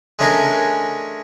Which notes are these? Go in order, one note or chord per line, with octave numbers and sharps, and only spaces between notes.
G#3 A3 C#4 D4 G#4 A#4